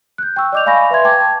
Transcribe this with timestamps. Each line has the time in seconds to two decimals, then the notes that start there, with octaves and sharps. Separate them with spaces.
0.18 F#6 G6
0.36 G5 C#6 E6
0.52 D5 D#5 D6 G6 F7
0.66 D5 F5 G#5 B5 C#6 A#6
0.91 B4 E5 C6 G#6
1.04 G5 A5 D6 G#6